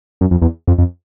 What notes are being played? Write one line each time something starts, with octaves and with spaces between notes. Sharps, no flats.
F#2
F2
E2
F2
F2